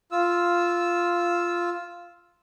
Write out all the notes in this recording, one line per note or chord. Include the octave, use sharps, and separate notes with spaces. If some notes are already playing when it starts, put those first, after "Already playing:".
F4 E6